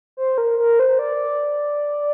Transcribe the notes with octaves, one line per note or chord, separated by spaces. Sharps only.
C5
A#4
A#4
C5
D5